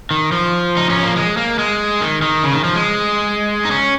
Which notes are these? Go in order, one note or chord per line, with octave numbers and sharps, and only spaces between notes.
D#3
F3
D#4
C#4
A#3
G#3
A#3
G#3
D#3
D#3
C#3
D#3
F3
G#3
D#4
C#4